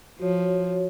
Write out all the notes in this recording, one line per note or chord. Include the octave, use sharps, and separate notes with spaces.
F3 F#4 C#5